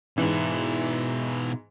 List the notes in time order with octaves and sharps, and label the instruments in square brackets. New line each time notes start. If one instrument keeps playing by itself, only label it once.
[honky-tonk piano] G#2 E3 [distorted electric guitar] B2 E4